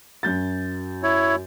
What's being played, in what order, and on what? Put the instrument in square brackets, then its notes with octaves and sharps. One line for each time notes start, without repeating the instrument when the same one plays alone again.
[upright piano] F#2 G6 A6
[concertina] E4 C#5